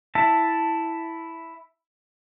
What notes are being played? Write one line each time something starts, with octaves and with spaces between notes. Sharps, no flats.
E4 E5 A5